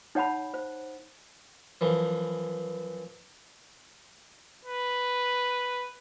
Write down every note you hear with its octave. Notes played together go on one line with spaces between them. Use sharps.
D#4 C#5 F#5 A5 B5
C5
F#2 E3 F3
B4